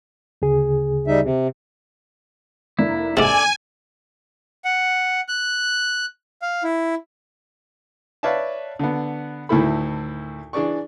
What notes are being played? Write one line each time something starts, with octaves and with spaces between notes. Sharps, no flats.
D2 C#3 G#4
G3 D#4 E5
C3
F1 A#3 D4 E4
G#2 C3 A4 D5 G#5
F#5
F#6
F5
E4
B4 C#5 D5 E5 F5 A5
D3 B3
D2 A2 D#3 E4 A4 B5
E3 D4 G#4 D5 C#6